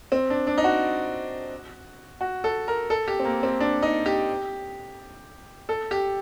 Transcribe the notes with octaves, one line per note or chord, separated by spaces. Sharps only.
C4
D4
D4
D#4
F#4
F#4
A4
A#4
A4
G4
C4
A#3
C4
D4
D#4
G4
A4
G4